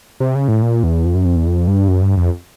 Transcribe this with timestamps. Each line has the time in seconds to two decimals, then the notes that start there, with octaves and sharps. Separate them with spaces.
0.20 C3
0.35 C#3
0.48 A2
0.62 A#2
0.83 E2
1.05 F2
1.15 F#2
1.25 F2
1.36 E2
1.47 F2
1.67 G2
1.88 F#2
2.02 G2
2.17 F2